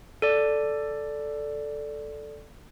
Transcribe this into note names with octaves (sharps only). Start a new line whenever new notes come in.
A4 D5